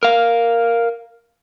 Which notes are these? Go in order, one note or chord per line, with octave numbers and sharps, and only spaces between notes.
A#4 F5